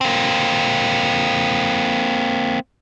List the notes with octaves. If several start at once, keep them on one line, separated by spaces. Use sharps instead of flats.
A#3 C4